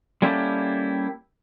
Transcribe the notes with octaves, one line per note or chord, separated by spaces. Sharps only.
G3 A#3 C#4 E4 G4 A4